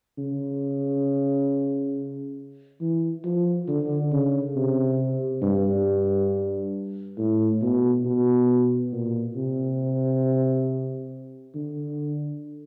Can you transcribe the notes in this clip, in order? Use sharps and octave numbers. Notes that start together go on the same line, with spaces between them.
C#3
E3
F3
D3
C#3
C3
G2
A2
B2
B2
A#2
C3
D3